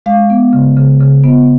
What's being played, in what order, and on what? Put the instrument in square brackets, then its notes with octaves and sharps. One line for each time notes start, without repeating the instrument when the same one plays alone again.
[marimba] G#3 F5
B3
C#3
C#3
C#3
B3